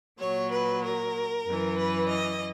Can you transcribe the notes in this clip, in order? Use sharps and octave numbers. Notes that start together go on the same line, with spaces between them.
A#2 F#3 C#5
B4
A#4
F#2 E3
B4
D#5